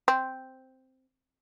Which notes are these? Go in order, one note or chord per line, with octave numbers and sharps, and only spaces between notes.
C4